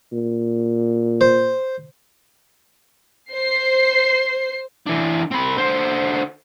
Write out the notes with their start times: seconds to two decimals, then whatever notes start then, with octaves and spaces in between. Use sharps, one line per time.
0.12 A#2
1.21 C5
3.32 C5 C7
4.87 E3 D4
5.32 C4 B5
5.57 D3 C5